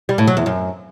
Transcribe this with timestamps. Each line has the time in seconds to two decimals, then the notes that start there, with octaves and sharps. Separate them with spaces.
0.09 G3
0.18 A2
0.27 F#3
0.37 E2
0.46 F#2